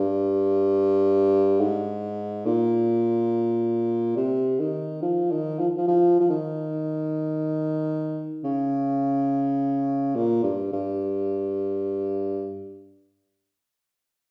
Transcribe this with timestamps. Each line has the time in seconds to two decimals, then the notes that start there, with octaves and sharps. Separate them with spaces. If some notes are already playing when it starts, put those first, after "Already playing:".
Already playing: G2
1.60 G#2
2.46 A#2
4.16 C3
4.60 D#3
5.02 F3
5.31 D#3
5.59 F3
5.77 F3
5.88 F3
6.20 F3
6.30 D#3
8.44 C#3
10.15 A#2
10.44 G2
10.73 G2